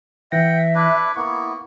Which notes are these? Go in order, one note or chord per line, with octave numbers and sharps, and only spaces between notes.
E3 E5 F#5 G5 A#6
D4 E4 B4
A#3 B3 E4 C#6